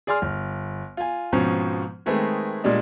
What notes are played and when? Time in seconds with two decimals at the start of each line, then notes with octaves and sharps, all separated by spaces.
0.07 G#4 D5 G#5 C6 F6
0.22 G1
0.97 F4 G#5
1.32 G#2 B2 F3 C4 C#4
2.06 D#3 G#3 A3 C4 G#4 B4
2.64 A#2 G3 G#3 D4 D#5